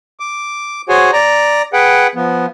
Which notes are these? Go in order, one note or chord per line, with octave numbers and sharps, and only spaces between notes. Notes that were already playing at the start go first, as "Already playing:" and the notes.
D6
F#4 G#4 C5 C#5 G#5
D5 A#5
G#4 B4 F#5 G5
F3 B3